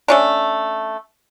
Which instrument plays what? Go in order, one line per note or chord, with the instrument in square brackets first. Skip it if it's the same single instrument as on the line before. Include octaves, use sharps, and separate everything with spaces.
[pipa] A3 C#4 D4